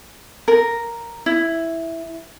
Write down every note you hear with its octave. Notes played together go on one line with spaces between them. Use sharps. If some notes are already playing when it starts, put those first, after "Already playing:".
A#4
E4